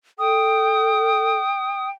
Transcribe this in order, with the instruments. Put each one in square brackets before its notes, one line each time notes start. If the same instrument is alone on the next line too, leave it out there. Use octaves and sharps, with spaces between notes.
[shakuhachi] A4 [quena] G5 [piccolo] D#6